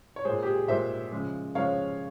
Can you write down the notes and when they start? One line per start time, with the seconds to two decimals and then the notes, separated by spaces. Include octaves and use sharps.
0.16 C#5
0.25 A#2 G#3 G#4 C5
0.43 G4
0.46 G#4
0.68 A#2 G#3 C5 E5
1.12 C#3 F3 G#3
1.55 C#3 F3 G#3 C#5 F5